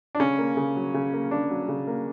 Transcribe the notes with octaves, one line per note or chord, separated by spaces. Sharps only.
D4
C#3 C#4
A#3
C#3
F#3
C#3
A#3
C#3 D4
F#3
C#3
A#3